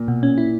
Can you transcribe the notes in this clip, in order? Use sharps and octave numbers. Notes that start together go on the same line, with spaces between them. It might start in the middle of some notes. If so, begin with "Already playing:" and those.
Already playing: A#2
B2
C#4
E4